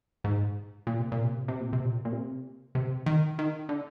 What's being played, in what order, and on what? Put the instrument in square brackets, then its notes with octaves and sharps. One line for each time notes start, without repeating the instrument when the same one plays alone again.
[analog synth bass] G#2
A#2
C3
A#2
C3
A#2
C3
A#2
C3
A#2
A#2
C3
C3
D#3
D#3
D3